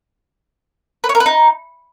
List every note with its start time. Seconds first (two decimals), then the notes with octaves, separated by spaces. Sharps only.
1.04 B4
1.09 C#5
1.15 A#4
1.20 B4
1.26 D#4